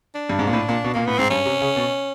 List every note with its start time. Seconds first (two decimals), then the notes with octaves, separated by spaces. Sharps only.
0.15 D4
0.29 G2
0.39 G#2
0.47 A#2
0.53 A2
0.69 A#2
0.84 B2
0.94 A#2 A#3
1.06 A2 B3
1.18 G#2 C4
1.30 G2 C#4
1.46 C3
1.61 C#3
1.76 B2